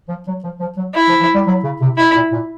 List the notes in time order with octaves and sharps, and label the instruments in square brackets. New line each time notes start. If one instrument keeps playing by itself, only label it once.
[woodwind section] F3
F#3
F3
F3
F#3
[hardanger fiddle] E4
[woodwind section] F3
F3
G3
F#3
C#3
C3
[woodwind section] B2 [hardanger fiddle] E4
[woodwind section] A#2
A#2